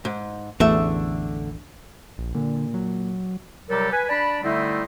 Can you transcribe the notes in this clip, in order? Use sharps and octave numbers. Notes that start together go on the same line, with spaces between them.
G#2
A1 E2 D3 A3 E5
A#1
A#2 D3
F#3
C3 F#3 G3 G4 A4 A#4
B4 G#5
D4 D5 A5 B5
D3 G3 A3 C4 D#4 E4